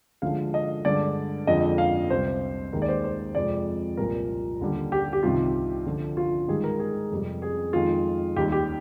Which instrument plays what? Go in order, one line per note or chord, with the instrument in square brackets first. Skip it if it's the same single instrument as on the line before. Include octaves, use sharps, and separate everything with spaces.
[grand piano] D2 D3 F3 G#3 F5
D#5
G2 D3 G#3 D5
F2 D3 F3 G#3 D#5
F5
C2 C3 G3 C5
D#2 D#3 G#3 A#4
D5
C5
C5
F2 C3 F3 G#3 D5
C2 A#2 F3 A#4
D#2 D3 G3
G4
G4
C2 C3 D#3 F4
D2 D3 F3
F4
G#2 D#3 G3 G#4
A#4
G#4
F2 C3 G3
G#4
F2 D#3 G#3 F4
D#2 D#3 G3 G4
G4